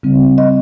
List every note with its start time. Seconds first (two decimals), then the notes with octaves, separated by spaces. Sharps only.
0.03 C#3 G3 C4
0.38 D#5